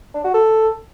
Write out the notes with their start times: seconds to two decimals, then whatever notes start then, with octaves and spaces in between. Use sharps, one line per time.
0.14 D4
0.24 F#4
0.34 A4